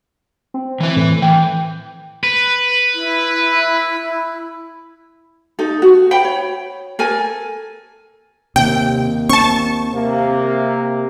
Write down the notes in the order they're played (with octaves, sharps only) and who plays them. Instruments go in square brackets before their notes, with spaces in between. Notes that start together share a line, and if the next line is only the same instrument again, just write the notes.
[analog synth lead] C4
[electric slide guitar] E3 B4
[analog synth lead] A2
[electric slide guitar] E3 [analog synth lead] G5
[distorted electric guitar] B4
[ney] E4
[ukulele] D#4 A4
F#4
F#5 G5 B5
C#5
A4 A#4 G#5
[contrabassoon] D#2 [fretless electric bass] C3 [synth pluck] G5
[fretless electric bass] C4 [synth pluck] A5 C#6
[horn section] C3 A#3